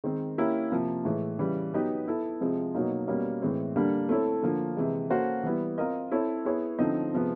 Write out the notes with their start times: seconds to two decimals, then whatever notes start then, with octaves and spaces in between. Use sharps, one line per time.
0.04 D#3 G#3 C4
0.38 A#3 C#4 E4 G4 A#4
0.71 C3 F3 A#3
1.05 A2 E3 G#3
1.39 C#3 E3 G3
1.74 F#3 B3 D#4 G4 B4
2.07 B3 E4 A4
2.40 C3 F3 G#3 C4
2.75 B2 F#3 A#3 D#4
3.08 B2 G3 A#3 C#4
3.42 A2 E3 G#3 C4
3.76 D3 G3 A#3 D4
4.09 A3 C4 E4 A4 C#5
4.43 D3 F3 A#3
4.77 C3 E3 G#3
5.10 A#3 C#4 F#4 A4 C5
5.43 E3 G3 B3 E4
5.78 C4 F4 A#4 D#5
6.11 C4 E4 A4 C#5
6.45 B3 E4 G#4 C#5
6.79 D3 F3 A3 C4 D#4
7.13 C3 F3 G#3 B3